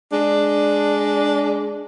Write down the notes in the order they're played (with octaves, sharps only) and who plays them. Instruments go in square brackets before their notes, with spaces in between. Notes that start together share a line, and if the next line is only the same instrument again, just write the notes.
[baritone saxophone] G#3 [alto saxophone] D4